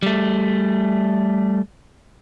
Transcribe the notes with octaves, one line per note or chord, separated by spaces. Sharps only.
G3 A3